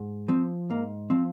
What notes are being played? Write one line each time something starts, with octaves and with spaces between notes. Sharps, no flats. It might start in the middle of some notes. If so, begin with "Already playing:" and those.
Already playing: G#2
F3 C4
G#2 A#3
F3 C4